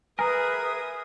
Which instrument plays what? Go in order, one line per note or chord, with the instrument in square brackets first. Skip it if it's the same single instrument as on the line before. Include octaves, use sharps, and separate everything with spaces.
[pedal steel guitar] G#4 A#4 [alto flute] B4 [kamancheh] E5 D#6 [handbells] G#5 A#5